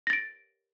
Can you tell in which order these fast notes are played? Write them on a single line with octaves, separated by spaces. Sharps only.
A#6 A6 D7